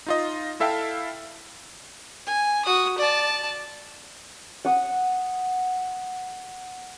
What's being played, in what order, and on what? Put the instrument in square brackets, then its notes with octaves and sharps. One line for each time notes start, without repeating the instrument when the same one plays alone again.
[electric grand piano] D#4 F4 D#5
E4 A4 E5 F5 G5 A5
[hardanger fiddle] G#5
F#4 D#6
D5 A5
[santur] F#5 D#6